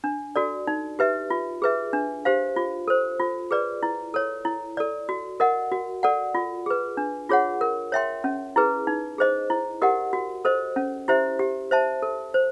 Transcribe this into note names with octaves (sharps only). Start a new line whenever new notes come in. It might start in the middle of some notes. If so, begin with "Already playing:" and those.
D4
F#4 A4 D5
D#4
G4 B4 E5
F4
G#4 B4 E5
D4
G4 C5 F5
F4
A4 C5
F4
G#4 B4 D5
E4
A4 C#5
E4
A4 D5
F#4
A#4 D#5 F#5
F#4
A4 D5 F#5
F4
G#4 B4
D4
F4 G#4 C#5 F#5
A#4
C#5 E5 G5 C6
C#4
E4 G#4 B4
D#4
G#4 C5 D#5
E4
G4 A#4 D#5 F#5
F#4
A4 C5 D#5
C#4
E4 G4 C5 E5
G4
C5 E5 A5
A4
C5